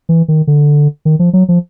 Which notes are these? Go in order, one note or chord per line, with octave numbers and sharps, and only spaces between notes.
E3
D#3
D3
D#3
F3
F#3
F3